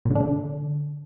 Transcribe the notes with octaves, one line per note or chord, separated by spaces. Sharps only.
A#2
D3
D4
D3